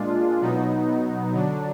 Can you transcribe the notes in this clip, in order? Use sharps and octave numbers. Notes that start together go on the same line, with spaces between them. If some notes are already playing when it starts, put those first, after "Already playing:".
Already playing: A#2 G#3 D4 F4
B2 F#3 B3 D#4
D3 F#3 D4